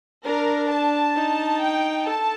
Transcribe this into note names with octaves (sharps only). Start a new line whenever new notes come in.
D4 A#4
A5
D#4
G5
A4 A5